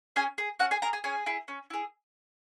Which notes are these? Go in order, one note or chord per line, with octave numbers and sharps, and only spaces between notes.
C#4 G#4 G#5
G#4
C#4 F#4 F#5
G#4 G#5
G#4 A#4 A#5
G#4 G#5
C#4 G#4 G#5
E4 G#4
C#4
E4 G#4